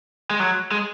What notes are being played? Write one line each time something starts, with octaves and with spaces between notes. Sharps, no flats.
G#3
F#3
G#3